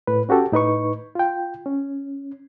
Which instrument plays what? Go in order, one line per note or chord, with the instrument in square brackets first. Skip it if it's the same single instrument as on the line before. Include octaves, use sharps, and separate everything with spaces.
[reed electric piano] A2 B4
C#4 F#4 G4 A4
A2 D#4 B4 C#6
F4 G5
C#4